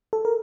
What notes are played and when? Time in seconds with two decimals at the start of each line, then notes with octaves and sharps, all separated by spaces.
0.13 A4
0.25 A#4